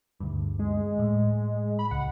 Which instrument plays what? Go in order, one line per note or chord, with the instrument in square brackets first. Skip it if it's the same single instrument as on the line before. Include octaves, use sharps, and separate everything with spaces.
[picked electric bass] D2 G2
[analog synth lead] G#3
[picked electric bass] A2
[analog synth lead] B5
[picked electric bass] C#2 [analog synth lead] F#5